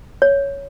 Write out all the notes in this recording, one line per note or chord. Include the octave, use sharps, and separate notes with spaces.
C#5